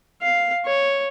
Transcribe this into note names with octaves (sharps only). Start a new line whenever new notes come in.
F5
C#5